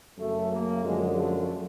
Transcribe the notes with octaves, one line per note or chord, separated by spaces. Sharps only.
F#2 C#3 F#3 A3
A#3
F#2 D3 F3 G#3
A3